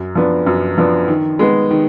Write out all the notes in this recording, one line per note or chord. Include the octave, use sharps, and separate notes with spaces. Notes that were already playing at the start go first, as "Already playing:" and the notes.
Already playing: F#2
F3 B3 D4
F#2
F3 B3 D4
D#3
G#3 B3
D#3